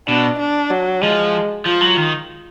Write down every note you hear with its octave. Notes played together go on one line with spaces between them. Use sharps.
B2 D4
D4
F#3
F3 G#3
F3 F4
F#3
D#3